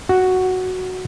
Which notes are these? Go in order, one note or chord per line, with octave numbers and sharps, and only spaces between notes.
F#4